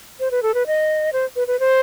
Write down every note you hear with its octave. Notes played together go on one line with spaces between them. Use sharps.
C5
B4
A4
B4
D#5
C5
B4
B4
C5